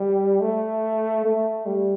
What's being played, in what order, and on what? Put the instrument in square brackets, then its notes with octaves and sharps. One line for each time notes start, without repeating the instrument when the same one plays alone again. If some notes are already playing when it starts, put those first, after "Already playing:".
Already playing: [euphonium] G3
A3
A3
G3